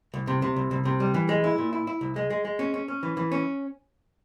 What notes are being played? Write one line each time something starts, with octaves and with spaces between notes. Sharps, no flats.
C2
C3
C3
C2
C2
C3
G3
E3
G#3
E4
A#2
E4
E4
C2
G#3
G#3
G#3
C#4
C#4
C#4
E3
E3
C#4